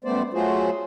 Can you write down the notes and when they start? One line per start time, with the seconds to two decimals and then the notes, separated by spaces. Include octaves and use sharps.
0.04 F#2 G3 A3 B3 C5 D5
0.33 F#3 A3 F4 F#4 G#4 C5